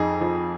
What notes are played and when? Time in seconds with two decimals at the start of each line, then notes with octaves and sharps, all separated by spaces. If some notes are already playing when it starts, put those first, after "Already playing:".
Already playing: F2 D#4 G#4
0.21 F3